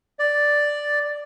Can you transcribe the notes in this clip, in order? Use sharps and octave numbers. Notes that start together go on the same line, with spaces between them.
D5